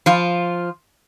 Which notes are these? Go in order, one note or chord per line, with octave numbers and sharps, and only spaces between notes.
F3 F4